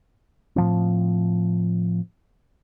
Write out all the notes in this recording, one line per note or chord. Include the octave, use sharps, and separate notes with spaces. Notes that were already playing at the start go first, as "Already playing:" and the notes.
A2 F3 C4